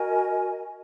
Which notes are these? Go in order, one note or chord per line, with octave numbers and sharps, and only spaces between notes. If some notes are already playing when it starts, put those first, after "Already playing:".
Already playing: F#4 A#4 D#5 G#5